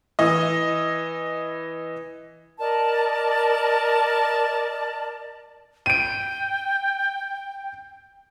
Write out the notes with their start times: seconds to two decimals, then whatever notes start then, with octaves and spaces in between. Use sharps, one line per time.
0.19 E3 D#5
2.59 A#4 D5 D#5 A5
5.86 G5 D7 D#7